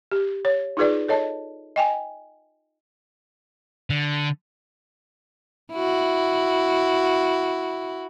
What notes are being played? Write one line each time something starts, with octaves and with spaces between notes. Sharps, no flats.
G4
C#5
D#4 F4 G#4 B4 D5
A4 C#5 D#5 A5
D#5 G5 G#5
D3
E4 F#4